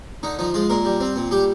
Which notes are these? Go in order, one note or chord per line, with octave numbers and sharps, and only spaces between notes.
D3 D#4
F3 D#4
G#3 F4
A#2 A#4
G3
C4
A#2
G3 G4